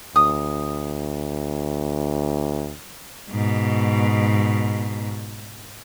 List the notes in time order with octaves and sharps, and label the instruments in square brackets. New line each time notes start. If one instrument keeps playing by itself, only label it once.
[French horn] D2 [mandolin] D#6
[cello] G#2 B2